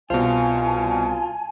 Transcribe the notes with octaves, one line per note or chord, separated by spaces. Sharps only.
C2 B2 F4 C5 G#5 A5